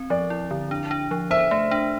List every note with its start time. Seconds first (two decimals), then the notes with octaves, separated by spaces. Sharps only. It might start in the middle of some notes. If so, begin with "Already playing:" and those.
Already playing: C4
0.10 F3 D5
0.30 E4
0.51 D3
0.71 D4
0.91 D4
1.11 F3
1.31 C5 E5
1.51 A3
1.71 D4